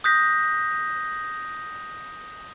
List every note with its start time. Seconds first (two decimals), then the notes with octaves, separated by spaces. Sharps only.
0.04 D#6 F#6 G6 A#6 B6